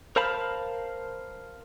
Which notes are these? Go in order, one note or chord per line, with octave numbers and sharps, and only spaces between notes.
A#4 C5 F5 A5 B5